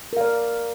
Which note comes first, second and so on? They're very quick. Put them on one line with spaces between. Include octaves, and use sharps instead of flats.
A#4 F5 D5